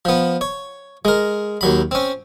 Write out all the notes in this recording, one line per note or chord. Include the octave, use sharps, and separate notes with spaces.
F3 B3
C#5
G#3 A#4
D#2 F#3 B5
C4 C#4